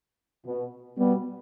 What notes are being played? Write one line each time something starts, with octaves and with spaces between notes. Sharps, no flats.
B2
B2 G3 B3